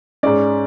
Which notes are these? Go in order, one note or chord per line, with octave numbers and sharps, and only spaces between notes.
G#2 G#3 C#4 D5